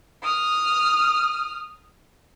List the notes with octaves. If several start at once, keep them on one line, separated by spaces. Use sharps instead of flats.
D#6 F6